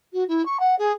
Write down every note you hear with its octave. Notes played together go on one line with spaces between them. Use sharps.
F#4
E4
C#6
F#5
G#4